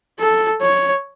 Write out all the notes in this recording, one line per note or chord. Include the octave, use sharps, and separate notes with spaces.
A4
C#5